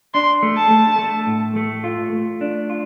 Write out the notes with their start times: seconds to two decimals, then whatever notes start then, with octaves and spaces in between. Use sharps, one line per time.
0.14 D4 C6
0.43 A3
0.57 A5
0.70 A3
0.99 A3
1.27 A2
1.56 A3
1.84 F4
2.13 A3
2.41 D4
2.70 F4